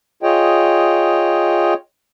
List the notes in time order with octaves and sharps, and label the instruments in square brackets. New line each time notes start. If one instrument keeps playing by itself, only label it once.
[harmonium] F4 G#4 C#5 D#5 G5